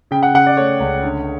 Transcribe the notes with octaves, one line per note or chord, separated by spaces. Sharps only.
C#3 G5
F#5
C#3 F#5
D5
A3 C#5
C#2
D3